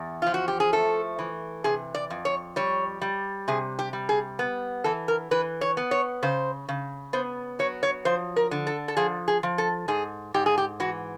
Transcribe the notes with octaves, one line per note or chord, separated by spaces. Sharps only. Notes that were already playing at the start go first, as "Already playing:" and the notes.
Already playing: E2
F3 F4
F#4
G4
G#4
A3 A4
E3
C3 G#4
D5
F2
C#5
G3 C#5
G3
C3 G#4
G4
G3
G#4
B3
E3 A4
A#4
E3 B4
C#5
B3
C#5
C#3 C5
C#3
B3 C5
F#3 C#5
C#5
F3 C5
A#4
D3
A4
A4
F3 G#4
G#4
F3
A4
G#2 G#4
G#2 G4
G#4
G4
E3 F#4